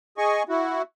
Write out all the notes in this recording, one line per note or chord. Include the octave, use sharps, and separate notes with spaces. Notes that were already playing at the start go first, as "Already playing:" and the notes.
G#4 D#5 G#5 C#6
E4 F#4